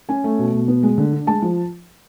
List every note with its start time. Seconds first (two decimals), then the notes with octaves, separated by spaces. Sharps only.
0.09 C#4 G#5
0.24 A3
0.39 B2
0.53 B2
0.68 B3
0.83 G#3
0.98 D3
1.12 D4
1.27 G#3 A5
1.42 F3